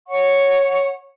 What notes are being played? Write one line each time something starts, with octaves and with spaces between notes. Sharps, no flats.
C#5 F#5 C#6